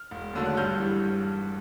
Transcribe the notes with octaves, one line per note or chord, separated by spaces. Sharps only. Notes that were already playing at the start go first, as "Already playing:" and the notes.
Already playing: F6
E1
D#2 D3 F#3 A3
F#6
G2 F6 G6
E3 G3